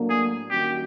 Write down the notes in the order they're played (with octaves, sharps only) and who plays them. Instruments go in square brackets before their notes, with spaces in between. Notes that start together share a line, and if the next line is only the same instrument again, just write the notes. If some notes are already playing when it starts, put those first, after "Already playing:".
Already playing: [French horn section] A2 F#3 A#3 D4
[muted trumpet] G#4
[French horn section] D#3 G3 A#3 C#4 F#4 [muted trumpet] G4